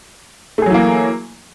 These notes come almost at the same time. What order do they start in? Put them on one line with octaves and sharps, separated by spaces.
A3 G#4 F#3 E3 A#3